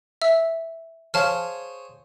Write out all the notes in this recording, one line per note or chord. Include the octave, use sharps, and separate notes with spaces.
E5 E6
G#4 C5 C#5 F5 A5 F6